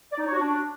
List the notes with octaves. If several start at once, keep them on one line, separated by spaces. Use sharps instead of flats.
D5
D#4
C#5
F#4
D4